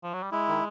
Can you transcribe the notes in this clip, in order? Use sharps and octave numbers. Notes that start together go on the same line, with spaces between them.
F3
F#3
G3
G#3 E4
D#3